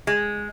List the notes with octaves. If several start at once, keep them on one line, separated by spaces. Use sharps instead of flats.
G#3